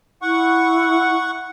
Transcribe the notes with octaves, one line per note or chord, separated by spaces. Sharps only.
E4 F#5 C#6